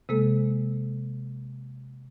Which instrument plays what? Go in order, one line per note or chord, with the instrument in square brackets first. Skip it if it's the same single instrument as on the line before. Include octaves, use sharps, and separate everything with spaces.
[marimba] C3 G#3 A#3 A4